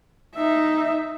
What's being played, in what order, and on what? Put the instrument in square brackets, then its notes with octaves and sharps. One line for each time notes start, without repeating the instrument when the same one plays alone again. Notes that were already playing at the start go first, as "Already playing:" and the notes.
[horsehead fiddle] D#4 E5